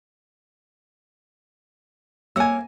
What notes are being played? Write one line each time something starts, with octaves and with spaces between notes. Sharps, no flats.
A#3 C#5 F#5 G#5 E6